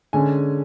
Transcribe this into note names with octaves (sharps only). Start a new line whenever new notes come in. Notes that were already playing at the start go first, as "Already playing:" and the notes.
D3 G#3 C#4 G#5